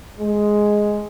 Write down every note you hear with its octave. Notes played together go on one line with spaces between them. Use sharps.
G#3